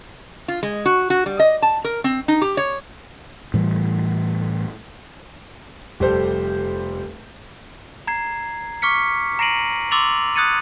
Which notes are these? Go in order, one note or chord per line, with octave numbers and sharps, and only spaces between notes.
F4
G#3
F#4
F#4
G3
D#5
A5
A#4
C4
D#4
G4
C#5
A2 E3 G3
F1 G3 G4 A4 C5 G6
A#5 G#6 C7
C#6 D6 F6 B6 C#7
A#5 A#6 C7 D7 D#7 F#7
C6 D6 E6 A6 F7 F#7
D#6 F#6 G#6 A6 C#7 D#7